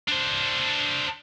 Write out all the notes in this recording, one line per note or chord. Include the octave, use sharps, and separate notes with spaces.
D4 C5